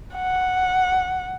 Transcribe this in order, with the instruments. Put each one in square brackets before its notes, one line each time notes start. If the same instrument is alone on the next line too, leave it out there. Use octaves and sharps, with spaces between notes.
[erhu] F#5